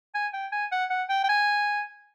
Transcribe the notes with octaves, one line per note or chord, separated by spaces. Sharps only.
G#5
G5
G#5
F#5
F#5
G5
G5
G#5